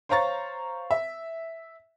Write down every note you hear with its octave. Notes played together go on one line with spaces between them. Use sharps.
C5 C#5 F5 A#5 C#6 A6
E5